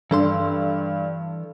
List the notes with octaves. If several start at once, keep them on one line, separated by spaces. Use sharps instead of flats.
G2 E3 D4 A4 C6